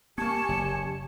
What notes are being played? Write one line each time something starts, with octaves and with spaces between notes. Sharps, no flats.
A#3 B3 G4 G#5 A5 C#6
F#1